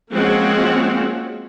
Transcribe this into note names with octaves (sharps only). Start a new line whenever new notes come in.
F3 G#3 A#3 C4 C#4 F#4